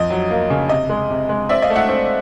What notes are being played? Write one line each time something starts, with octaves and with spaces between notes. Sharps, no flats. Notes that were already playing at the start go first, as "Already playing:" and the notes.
Already playing: F2 D#5
F#3
A#3
C#3
C3 D#5
G#3
C3
G#3
C4 D5 E5
D#5 F5
A3
E5 F#5
C4